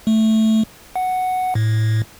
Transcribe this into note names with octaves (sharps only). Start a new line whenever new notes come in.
A3
F#5
A2